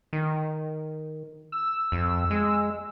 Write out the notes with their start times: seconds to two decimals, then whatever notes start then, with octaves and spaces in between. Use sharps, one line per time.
0.13 D#3
1.52 E6
1.92 F2
2.31 G#3